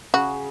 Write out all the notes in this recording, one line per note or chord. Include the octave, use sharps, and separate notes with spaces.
C#3 F#4